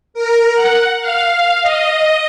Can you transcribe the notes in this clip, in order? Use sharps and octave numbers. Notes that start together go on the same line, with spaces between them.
A#4
F#5
F5
D#5